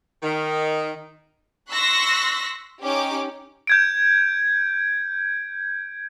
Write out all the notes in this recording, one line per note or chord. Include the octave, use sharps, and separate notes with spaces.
D#3
C6 C#6 E6 F#6 A#6 B6
C#4 D#4 G4 D6
G6 G#6 D7